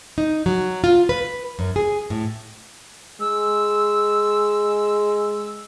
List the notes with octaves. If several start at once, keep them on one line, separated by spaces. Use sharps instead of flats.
D#4
F#3
F4
B4
F#2
G#4
A2
G#3 E6